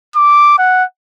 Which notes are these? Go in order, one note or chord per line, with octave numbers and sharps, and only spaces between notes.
D6
F#5